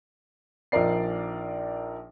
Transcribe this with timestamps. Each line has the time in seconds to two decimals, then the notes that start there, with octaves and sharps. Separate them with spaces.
0.72 A#1 F3 D#4 A#4 D5 C7